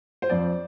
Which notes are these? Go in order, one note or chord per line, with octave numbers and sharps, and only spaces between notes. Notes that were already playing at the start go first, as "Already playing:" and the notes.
C5
F2 D5